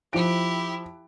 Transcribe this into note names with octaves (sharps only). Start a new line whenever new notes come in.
F3 E4 G4 D7